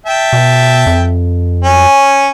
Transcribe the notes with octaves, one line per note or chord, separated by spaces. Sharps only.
E5 G5 A5
B2
F2
C#4